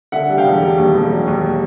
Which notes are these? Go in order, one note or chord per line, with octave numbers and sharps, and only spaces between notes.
D3 E5 F#5
G3
F5 G5
E1
G3
D#2
E1
F#3
D#2